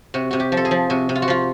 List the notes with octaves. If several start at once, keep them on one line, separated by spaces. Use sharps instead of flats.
C3 F#4
C3 F#4
G4
F3
A4
G#4
F3
C3 F#4
C3
F4
F#4
F3 F4